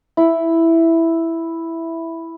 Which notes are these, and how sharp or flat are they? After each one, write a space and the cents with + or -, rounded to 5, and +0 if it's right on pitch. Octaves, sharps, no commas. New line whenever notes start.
E4 +0